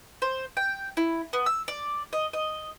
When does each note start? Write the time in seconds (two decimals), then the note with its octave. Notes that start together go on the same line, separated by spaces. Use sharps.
0.22 C5
0.57 G5
0.97 E4
1.33 B3
1.46 E6
1.68 D5
2.13 D#5
2.33 D#5